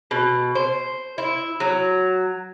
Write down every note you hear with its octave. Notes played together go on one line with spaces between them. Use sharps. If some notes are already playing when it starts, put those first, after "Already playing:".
B2
C5
E4
F#3